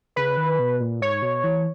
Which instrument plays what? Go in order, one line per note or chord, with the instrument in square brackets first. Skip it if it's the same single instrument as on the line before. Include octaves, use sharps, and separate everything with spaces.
[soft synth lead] C#3 [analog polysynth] B4
[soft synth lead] D#3
B2
A#2
[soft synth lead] G#2 [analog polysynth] C#5
[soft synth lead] B2
E3